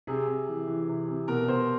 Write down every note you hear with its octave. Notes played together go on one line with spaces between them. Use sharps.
C3 G#4
C3
E3
E3
C3
C3
B2 A#4
B2 C5